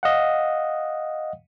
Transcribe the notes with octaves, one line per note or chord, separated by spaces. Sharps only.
D#5 F5 F#5